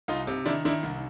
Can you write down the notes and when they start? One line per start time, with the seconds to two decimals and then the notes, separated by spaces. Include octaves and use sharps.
0.08 C2 D#4 F4
0.27 C3
0.46 D#3 D4 E4
0.65 D#3 D4 E4
0.83 C2